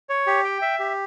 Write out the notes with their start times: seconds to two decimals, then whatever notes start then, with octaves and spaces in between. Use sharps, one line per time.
0.09 C#5
0.27 G4
0.44 G5
0.62 E5
0.80 G4